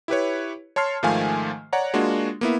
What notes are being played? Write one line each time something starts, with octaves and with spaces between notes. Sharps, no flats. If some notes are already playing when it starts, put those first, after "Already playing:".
E4 G4 B4 C#5
C#5 A5 C6 F6 C7
G#2 D#3 F3 A3 F5 G#5
C#5 D5 F#5 A#5
G#3 A#3 D4 F4 F#4
A#3 B3 E4